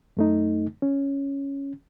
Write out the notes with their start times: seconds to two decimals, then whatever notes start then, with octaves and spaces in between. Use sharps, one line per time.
0.17 F#2 A3 D#4
0.82 C#4